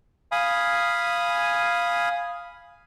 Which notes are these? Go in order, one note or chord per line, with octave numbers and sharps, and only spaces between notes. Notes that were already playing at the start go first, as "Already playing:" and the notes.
F5 G#5 B5 D#6